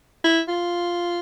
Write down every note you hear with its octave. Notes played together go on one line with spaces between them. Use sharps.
E4
F4